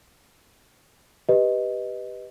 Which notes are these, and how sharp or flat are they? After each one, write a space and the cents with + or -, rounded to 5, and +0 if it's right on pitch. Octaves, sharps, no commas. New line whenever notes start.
G4 +0 B4 +0 D#5 +0